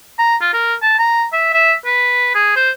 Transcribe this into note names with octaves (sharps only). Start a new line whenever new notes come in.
A#5
F4
A#4
A5
A#5
E5
E5
B4
G#4
C5